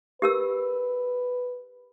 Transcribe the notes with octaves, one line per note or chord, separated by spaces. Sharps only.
G4 A#4 B4 E6